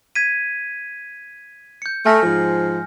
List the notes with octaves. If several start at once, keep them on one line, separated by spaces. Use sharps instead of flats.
G#6 B6 D#7
G6 C#7
A3 G#5 F6 A#6
G#2 F3